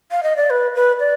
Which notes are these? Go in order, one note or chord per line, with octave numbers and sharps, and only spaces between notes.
F5
D#5
D5
B4
B4
D5